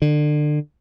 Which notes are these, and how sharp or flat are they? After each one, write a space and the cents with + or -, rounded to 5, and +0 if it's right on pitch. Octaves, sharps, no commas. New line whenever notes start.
D3 +30